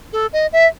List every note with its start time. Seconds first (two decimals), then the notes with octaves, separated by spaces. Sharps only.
0.13 A4
0.33 D#5
0.53 E5